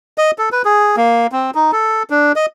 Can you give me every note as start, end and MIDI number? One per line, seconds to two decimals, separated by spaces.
0.18 0.31 75
0.38 0.49 69
0.52 0.62 71
0.65 0.96 68
0.97 1.27 58
1.32 1.51 60
1.55 1.71 63
1.72 2.03 69
2.10 2.32 62
2.36 2.46 75